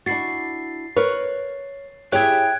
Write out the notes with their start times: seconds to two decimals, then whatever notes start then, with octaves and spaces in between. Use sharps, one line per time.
0.06 D4 E4 F#4 A6 C7
0.97 A#4 B4 C#5
2.12 E4 G4 G#4 C#5 E5 G5 F#6 G#6